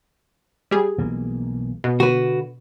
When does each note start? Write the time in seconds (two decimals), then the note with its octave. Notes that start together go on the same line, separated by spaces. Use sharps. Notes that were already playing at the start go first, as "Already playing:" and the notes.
0.71 G3 G#4
0.98 B1 E3 A#3
1.84 B2
2.00 D3 F#4 B4